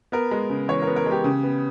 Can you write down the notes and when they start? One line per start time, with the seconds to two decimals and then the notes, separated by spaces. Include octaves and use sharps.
0.12 B3 A#4
0.31 G#3
0.49 C#3
0.68 E3 C#5
0.82 A#4
0.87 B3
0.96 A#4
1.06 G#3
1.11 G4
1.24 C#3
1.43 B3